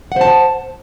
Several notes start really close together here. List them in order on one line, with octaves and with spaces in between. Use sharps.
F#5 C5 A5